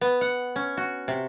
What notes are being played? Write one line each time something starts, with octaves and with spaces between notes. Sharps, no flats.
B3
F#5
C#4
F#4
C3